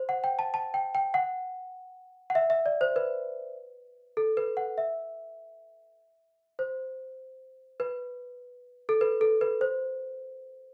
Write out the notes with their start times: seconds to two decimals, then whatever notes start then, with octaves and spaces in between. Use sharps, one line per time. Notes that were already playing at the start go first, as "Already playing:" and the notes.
Already playing: C5
0.09 F#5
0.24 G5
0.39 A5
0.54 A5
0.74 G5
0.95 G5
1.14 F#5
2.30 F#5
2.35 E5
2.50 E5
2.66 D5
2.81 C5
2.96 B4
4.17 A4
4.37 B4
4.57 F#5
4.78 E5
6.59 C5
7.80 B4
8.89 A4
9.01 B4
9.21 A4
9.41 B4
9.61 C5